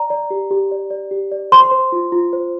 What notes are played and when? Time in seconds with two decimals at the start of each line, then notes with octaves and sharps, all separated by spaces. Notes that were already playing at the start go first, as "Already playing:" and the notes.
Already playing: D5 A#5
0.10 D5
0.30 G4
0.51 G4
0.71 D5
0.90 D5
1.11 G4
1.32 D5
1.52 C5 C6
1.71 C5
1.92 F4
2.12 F4
2.33 C5